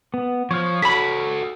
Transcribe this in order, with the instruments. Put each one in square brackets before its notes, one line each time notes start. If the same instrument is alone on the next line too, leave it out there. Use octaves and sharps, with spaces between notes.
[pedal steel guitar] B3
[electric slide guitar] F3 [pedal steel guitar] C#5 F6
[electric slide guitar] F#4 A4 [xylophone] B5 B6